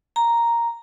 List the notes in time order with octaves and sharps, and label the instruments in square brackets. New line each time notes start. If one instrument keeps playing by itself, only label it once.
[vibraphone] A#5